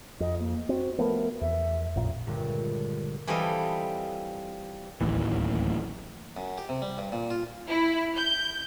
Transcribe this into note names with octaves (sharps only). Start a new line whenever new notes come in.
F2 D#5
A#3
C4 F#4
F3 A3 B3 A#4
E2 E5
A1 F2 A#2
C#2 G2 A#2 D3
E3 G3 C4 F4 A4 D#5
D1 A1 D#2 E3
F#2
G4
C3
G3
G2
A#2
F4
E4
G6